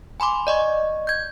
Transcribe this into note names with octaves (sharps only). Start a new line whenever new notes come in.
G#5 B5 C6 D6
D5 D#5 C#6
G6 G#6